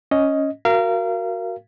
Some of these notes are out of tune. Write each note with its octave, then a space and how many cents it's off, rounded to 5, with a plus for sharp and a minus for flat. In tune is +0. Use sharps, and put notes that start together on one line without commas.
C#4 +0 D#5 +5
F#4 +0 A#4 -5 F5 -30